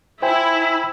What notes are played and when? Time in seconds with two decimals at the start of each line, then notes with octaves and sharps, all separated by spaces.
0.22 E4 C5 G5 G#5